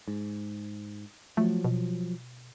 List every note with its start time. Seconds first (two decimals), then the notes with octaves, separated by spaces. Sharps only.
0.08 G#2
1.37 F3 F#3 A3
1.64 B2